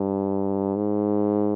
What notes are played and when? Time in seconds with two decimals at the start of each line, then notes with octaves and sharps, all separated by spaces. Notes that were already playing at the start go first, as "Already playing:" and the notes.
Already playing: G2
0.76 G#2